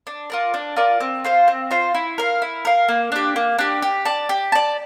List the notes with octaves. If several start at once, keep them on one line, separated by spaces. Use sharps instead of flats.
D4
F4 A#4 D5
D4
F4 A#4 D5
C4
F4 C5 F5
C4
F4 C5 F5
E4
A#4 F5
E4
A#4 F5
A#3
D4 G4
A#3
D4 G4
G4
D5 A5
G4
D5 A5